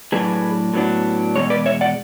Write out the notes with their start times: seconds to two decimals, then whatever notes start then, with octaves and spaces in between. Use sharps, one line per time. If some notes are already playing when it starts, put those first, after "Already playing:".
0.12 A2 F#3 B3 D4 G#4 B4
0.74 A2 F#3 B3 D4
1.36 E2 B2 G#3 C#5
1.50 B4 D5
1.66 C#5 E5
1.81 D5 F#5